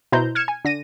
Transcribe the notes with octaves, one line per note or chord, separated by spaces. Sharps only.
B2 E4 C5 A#5 G6
F6 G#6 C#7 E7
G#5
D3 A#6 D#7